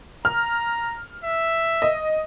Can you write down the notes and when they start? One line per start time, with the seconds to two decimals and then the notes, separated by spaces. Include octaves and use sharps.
0.25 A#5 F6
1.24 E5
1.82 D#5